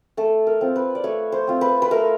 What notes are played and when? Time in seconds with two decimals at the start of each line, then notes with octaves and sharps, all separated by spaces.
0.17 A3 A4
0.47 A#4
0.61 C4 F4
0.76 B4
0.95 D5
1.04 A3 C#5
1.32 C5
1.47 C4 F4
1.61 B4
1.82 B4
1.91 A3 A#4